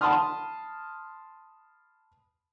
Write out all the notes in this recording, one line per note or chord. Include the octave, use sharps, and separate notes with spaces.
A5 B5 C6 D#6 F6